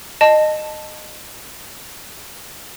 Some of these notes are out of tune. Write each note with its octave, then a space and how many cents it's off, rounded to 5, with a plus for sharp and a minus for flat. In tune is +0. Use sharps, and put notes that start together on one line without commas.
D#5 -20 A5 +0